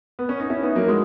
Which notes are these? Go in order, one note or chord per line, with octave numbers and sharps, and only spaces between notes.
B3
C#4
D#4
C#4 E4
B3 D#4
F#3 A#3
G#3